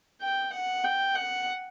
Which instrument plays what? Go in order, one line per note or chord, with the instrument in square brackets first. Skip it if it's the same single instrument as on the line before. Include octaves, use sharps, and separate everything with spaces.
[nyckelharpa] G5
F#5
G5
F#5